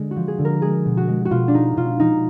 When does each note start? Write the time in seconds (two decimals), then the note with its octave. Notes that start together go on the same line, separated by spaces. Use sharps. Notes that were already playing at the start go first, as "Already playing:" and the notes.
Already playing: D3 G#3 D4
0.11 F#4
0.16 F3
0.28 G#4
0.39 D3
0.45 A#4
0.62 G#3 G#4
0.86 B2
0.97 F#4
1.08 G#3
1.25 F#4
1.31 B2 F4
1.48 D4
1.54 G#3 D#4
1.76 B2 F4
2.00 F3 D#4